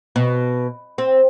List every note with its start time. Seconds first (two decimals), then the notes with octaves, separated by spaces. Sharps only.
0.16 B2
0.98 C4